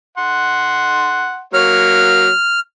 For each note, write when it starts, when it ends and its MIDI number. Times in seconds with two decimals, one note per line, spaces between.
0.18 1.41 78
0.18 1.41 84
1.54 2.29 54
1.54 2.29 58
1.54 2.29 73
1.54 2.60 89